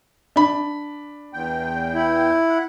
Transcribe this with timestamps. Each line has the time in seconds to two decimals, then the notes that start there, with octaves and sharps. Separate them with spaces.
0.36 D4 B5
1.33 E2 G5
1.94 E4
2.49 F#5